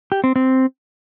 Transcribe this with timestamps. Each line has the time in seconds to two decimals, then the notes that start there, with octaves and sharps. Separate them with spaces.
0.12 G4
0.24 C4
0.36 C4